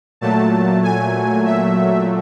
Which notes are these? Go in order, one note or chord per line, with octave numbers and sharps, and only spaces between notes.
A#2 F#3 A3 A5
G#5
E5